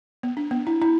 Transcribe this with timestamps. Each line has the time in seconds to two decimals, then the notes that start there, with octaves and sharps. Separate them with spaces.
0.23 B3
0.37 D4
0.51 B3
0.67 E4
0.82 E4